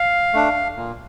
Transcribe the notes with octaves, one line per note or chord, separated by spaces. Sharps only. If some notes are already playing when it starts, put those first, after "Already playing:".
Already playing: F5
A3 D4
A#2